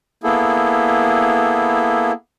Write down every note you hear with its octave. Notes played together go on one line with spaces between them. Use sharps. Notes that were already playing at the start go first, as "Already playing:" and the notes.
A#3 B3 E4 G#4 A4